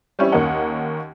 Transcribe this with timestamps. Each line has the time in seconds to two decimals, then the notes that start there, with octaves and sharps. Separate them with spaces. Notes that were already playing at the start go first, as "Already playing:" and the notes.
0.19 G3 C4 C#4 E4
0.32 D#2 A#3 C#4 A#4 D#5 F#5